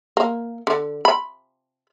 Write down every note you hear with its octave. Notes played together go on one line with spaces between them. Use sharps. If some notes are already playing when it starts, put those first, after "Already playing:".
A#3
D3
B5